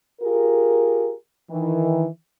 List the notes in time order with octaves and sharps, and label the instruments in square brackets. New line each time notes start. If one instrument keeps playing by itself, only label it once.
[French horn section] F4 G4 G#4 A#4
D#3 E3